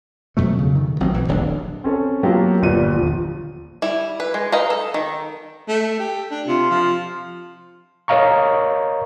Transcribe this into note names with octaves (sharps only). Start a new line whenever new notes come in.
F2 B2 F#3 A3
C#3
D#3
A1 F#3 C4
A#1 E3
D1 A#1 E2 D4
C4 C#4 A4
F#3 A#3 B3 F4 G4
G1 A#2 G3 D#7
D#1 F3
G3 E4
B4
G#3
B4 D#5 F5 G5 A#5
A4
D#3
A3
G4
D4
C3 F4
F3
A#4 C#5 D#5 F5 A#5 C#6